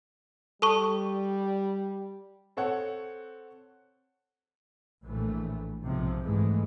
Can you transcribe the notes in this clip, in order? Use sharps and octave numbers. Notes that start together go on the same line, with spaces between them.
G3 A4 A5 C#6
C4 A4 C#5 F#5
A#1 A2 E3 A3
B1 G#2 C3 F3
G#2 E3 G#3 A3